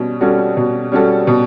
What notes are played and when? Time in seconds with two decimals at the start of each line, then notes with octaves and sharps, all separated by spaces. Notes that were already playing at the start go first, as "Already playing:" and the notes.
Already playing: B2 G3 C#4
0.21 G3 C#4 F#4 A4
0.57 B2
0.92 G3 C#4 F#4 A4
1.27 B2